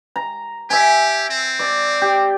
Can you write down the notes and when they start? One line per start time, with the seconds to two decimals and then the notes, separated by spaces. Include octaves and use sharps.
0.16 A#5
0.70 G4 E5 G#5
1.30 C4
1.59 D5
2.02 G4